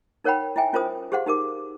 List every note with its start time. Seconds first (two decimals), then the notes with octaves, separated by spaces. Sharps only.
0.24 D#4 A#4 C#5 F#5 G5 B5
0.56 E4 E5 G5 G#5
0.73 C#4 F4 A#4 C5 D#6
1.12 G4 G#4 C5 F5 F#5 C6
1.26 D#4 G4 A#4 D6